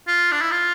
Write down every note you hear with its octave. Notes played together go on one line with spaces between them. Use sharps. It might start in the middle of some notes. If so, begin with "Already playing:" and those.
F4
D4
E4
F4